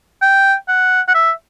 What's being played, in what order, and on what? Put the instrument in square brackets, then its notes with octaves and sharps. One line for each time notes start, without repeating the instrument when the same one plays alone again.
[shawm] G5
F#5
F#5
E5